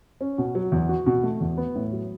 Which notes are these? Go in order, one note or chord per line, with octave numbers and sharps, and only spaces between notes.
C#4
B2
F#3
E2
F#4
B2
A3
E2
B3
A2
F#3